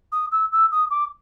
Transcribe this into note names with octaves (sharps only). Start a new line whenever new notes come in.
D#6
E6
E6
D#6
D6